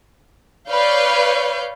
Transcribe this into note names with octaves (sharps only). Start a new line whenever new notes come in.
B4 C#5 D5 F5 G6